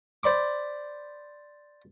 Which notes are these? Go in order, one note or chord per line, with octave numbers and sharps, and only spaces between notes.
C5 D5 B5 D6